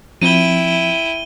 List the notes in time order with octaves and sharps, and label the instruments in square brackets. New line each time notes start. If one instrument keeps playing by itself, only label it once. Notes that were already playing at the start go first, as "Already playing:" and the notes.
[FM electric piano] F3 C4 [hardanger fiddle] E4 G5 [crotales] D#7 G7